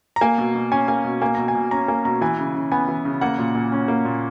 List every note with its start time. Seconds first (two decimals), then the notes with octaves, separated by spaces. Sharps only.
0.16 A#5
0.21 A#3 G#5
0.38 B2
0.55 B2
0.72 C#4 G#5
0.88 A#3 G#5
1.04 B2
1.21 A#3 G#5
1.35 B2 A#5
1.48 G#5
1.55 B2
1.71 C#4 A#5
1.88 A#3 G#5
2.05 B2 A#5
2.21 E3 G#5
2.38 C#3
2.55 C#3
2.72 B3 G#5
2.88 E3
3.05 C#3
3.21 A#3 F#5
3.38 A#2
3.55 A#2
3.72 C#4
3.88 A#3
4.05 A#2